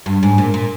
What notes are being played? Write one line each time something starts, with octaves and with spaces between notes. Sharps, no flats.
G2
G#2
A#2
A#2